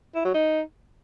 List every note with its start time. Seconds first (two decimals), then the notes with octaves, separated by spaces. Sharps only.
0.15 E4
0.25 F#3
0.34 D#4